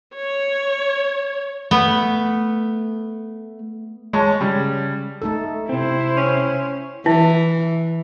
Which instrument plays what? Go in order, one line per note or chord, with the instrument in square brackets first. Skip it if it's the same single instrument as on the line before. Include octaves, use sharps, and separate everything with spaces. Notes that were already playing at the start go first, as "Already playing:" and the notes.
[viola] C#5
[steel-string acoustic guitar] A3 [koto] B3
[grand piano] G#3 C#5 A5
C#3 G3
[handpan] A3 D#4 A4
[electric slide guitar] C3 C4 [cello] E4 C5
[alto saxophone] C#4
[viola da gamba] E3 [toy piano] E4